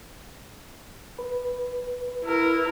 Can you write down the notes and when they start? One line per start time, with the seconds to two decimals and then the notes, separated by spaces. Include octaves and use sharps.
1.19 B4
2.25 E4 A#4